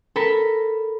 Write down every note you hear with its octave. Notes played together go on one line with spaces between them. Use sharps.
A4 A#4 B5